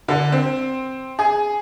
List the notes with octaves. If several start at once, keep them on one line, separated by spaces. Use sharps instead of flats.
D3
C4
G#4